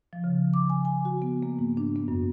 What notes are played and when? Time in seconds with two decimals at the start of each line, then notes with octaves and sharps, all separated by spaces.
0.13 F3
0.24 C#3
0.54 D6
0.70 G#5
0.85 G#5
1.05 F#4
1.22 B3
1.43 A#3
1.59 G#2
1.77 D4
1.96 B3
2.08 F#2